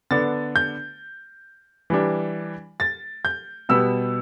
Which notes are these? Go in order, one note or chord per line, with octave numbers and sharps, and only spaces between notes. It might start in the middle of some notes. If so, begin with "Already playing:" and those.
D3 B3 D4 A6
G6
E3 G3 D4
A6
G6
B2 G3 B3 E6